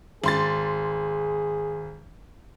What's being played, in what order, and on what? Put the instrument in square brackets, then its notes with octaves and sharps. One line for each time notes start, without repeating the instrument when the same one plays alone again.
[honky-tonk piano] G#1 C6 A6 [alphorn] G#4